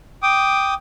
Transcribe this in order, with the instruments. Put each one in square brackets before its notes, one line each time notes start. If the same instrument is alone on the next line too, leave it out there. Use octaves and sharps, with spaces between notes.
[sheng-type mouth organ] G5 D6 D#6